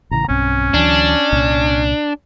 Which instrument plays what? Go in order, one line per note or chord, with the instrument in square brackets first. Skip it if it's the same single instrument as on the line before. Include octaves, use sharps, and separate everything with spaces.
[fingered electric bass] A1 C#3 E3 [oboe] A#5
[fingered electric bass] B1 G2 C4 [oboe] C#4
[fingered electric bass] D2 E3 F#3 [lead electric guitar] D4
[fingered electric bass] C2 A#2